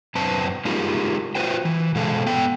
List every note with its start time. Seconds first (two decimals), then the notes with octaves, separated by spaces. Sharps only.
0.15 F#2 C4 B4 A5
0.65 G#3 D#4 F4 G4 G#4 A#4
1.35 F4 F#4 A4 B4 C5 G5
1.65 E3
1.95 B2 G#3 A4 F5
2.26 B3 A4 G5